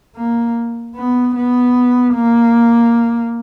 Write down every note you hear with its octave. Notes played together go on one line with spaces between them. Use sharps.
A#3
B3
B3
A#3